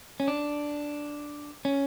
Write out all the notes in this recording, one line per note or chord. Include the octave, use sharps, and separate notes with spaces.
C#4
D4
C#4